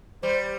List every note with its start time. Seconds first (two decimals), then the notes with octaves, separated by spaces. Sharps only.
0.23 G3 C5